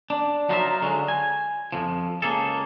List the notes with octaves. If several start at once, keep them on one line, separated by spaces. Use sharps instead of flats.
D4
F#3 D#4 F4 A#4 D5 E5
D3 F#3 G#3
G#5
F2 F3
C#2 A#3 G#4 A4